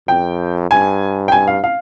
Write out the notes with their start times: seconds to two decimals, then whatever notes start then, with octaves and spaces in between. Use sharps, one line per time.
0.08 F2 G5
0.71 G2 G#5
1.28 G5
1.32 G2 G#5
1.48 F5
1.64 F5